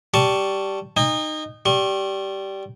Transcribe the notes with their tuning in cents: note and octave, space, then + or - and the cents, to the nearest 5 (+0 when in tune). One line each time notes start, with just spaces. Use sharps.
G3 -10 A5 +0 C#6 +0
D#4 -15 G5 +45
G3 -15 C#6 -45